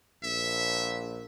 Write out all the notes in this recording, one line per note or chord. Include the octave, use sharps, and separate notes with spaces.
A#1 E5